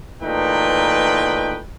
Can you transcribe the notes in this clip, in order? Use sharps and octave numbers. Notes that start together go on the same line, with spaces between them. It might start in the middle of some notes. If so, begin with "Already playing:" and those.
A#2 E3 A3 D#4 B4 G5